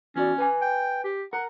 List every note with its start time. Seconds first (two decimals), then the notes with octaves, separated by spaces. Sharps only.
0.16 E2 C#4 F#4 D5
0.38 B4 G#5
0.62 G5
1.04 G4
1.33 A#4 F#5